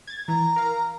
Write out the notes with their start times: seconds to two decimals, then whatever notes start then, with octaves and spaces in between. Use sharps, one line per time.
0.07 G#6 A6
0.28 E3 A#5
0.56 A#4 F5